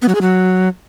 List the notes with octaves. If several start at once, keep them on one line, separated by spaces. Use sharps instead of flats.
B3
F#3
G#4
F#3